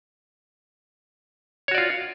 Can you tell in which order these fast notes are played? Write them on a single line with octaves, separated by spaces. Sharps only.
C#5 F#4 D5 F4